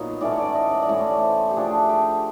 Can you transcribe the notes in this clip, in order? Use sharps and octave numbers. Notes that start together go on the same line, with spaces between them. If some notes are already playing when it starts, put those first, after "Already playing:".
Already playing: A#2 F#3 B3 D#4 C#5
A2 E3 A3 C#4 D5
C#5
D5
D#5
D5
D5
A2 E3 A3 C#4 C#5
C5
G4
F3 A3 D4 G#4
G4